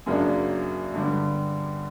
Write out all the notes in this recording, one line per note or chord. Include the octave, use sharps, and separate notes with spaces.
F#2 C#3 F#3 A#3 D4
G2 D3 G3